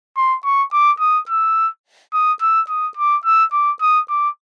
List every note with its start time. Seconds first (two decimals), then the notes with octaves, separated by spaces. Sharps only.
0.17 C6
0.45 C#6
0.72 D6
1.00 D#6
1.29 E6
2.13 D#6
2.41 E6
2.69 D#6
2.97 D6
3.25 E6
3.52 D6
3.81 D#6
4.09 D6